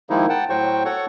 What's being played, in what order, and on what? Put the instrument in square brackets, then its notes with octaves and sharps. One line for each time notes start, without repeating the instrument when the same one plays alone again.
[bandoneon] D#3 F3 G#3 A#3 D#4 E4
F#5 G5 A5
A2 F#3 F#4 C5 G5 C#6
F#4 A4 C#5 F#5 C#6